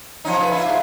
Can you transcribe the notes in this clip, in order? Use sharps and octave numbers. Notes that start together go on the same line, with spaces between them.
F3 C#4 D#4
F4 B4
E4 F4
G#2 F4